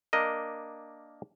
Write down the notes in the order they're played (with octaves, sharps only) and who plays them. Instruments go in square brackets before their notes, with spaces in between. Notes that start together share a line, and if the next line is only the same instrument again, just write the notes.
[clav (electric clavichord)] A#3 D4 A#4 D#5